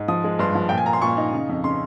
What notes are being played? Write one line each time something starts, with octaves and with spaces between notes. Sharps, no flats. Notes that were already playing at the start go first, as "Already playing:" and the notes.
Already playing: G#2
F3 D#6
G#3
G2 C6
F3
A#2 G5
G#5
A#2 A#5
C6
A#2 C#6
D#4
C#3
F2
C#3 C6